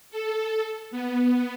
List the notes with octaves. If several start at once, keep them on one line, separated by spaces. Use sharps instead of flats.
A4
B3